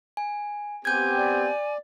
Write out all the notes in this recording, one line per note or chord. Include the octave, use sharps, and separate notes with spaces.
G#5
B3 C4 G4 G#5 G6 G#6
D5